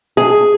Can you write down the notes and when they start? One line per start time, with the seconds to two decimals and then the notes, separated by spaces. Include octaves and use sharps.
0.17 G#4